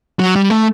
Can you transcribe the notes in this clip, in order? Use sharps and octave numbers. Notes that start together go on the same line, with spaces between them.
F#3
G3
A3